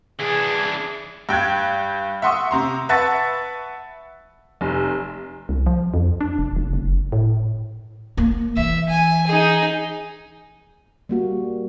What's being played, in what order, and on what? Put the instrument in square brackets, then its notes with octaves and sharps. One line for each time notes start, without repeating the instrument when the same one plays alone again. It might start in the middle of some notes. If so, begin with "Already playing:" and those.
[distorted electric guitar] E3 D4 [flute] G#4
[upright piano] G2 G5 F#6 G#6
E5 F#5 C6 C#6 D#6 E6
C3 A#5 C6
B4 E5 F#5 A5 C#6 A6
[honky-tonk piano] F1
[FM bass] C2
F3
F2
D4
F1
F1
F#1
A2
[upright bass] A#3
[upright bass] E3 [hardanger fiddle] E5
[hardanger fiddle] G#5
D#4 G#4
[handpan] G3 A#3 F#4